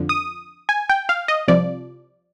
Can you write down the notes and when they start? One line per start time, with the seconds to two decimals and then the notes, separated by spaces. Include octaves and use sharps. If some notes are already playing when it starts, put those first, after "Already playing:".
Already playing: F2 D3 F3
0.09 D#6
0.69 G#5
0.90 G5
1.09 F5
1.28 D#5
1.48 C2 C3 F3 D5